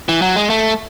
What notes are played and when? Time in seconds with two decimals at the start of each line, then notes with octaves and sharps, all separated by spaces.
0.09 E3
0.22 F#3
0.36 G#3
0.50 A3